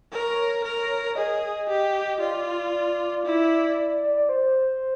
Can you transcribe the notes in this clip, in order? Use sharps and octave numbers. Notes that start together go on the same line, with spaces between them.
A#4 C#5
A#4
G#4 D#5
G4
F4 D5
E4
C5